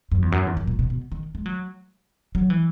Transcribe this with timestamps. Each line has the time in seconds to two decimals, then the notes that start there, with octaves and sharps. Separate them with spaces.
0.12 F#2
0.22 E2
0.32 F#2
0.47 E2
0.57 F#2
0.67 A#2
0.79 B2
0.90 B2
1.12 D#3
1.35 G#3
1.46 F#3
2.35 F#3
2.50 E3